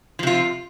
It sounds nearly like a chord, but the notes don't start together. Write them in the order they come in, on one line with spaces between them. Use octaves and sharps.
F3 C3 F4